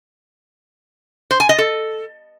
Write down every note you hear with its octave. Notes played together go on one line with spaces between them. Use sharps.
C5
G#5
D#5
A4